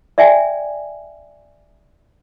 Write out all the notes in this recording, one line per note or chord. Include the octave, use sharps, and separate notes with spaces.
D5 E5 G5 G#5